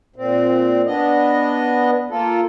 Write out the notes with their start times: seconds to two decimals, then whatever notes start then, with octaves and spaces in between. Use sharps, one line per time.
0.16 A#2 C4
0.86 B3 D4 D#5
2.10 A#3 F4 A4